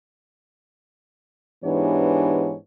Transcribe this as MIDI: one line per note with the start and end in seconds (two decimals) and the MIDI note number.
1.64 2.54 44
1.64 2.54 52
1.64 2.54 59
1.64 2.54 62
1.64 2.54 67
1.64 2.54 73